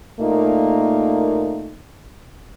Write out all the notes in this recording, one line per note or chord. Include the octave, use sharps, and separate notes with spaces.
A#2 A3 A#3 D#4